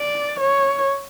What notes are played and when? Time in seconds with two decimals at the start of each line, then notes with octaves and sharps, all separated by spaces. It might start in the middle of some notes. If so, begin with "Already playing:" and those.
Already playing: D5
0.39 C#5